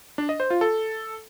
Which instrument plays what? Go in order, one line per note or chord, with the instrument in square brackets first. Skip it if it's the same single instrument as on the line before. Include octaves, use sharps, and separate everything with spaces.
[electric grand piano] D4
D#5
C5
F4
A4